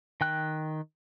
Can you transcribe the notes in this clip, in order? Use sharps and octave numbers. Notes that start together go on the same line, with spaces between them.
D#3 G5 F#6